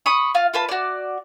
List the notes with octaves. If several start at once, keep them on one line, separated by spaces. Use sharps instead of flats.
B5 C#6 D#6
F4 F5
F4 B4 A5
F#4 D5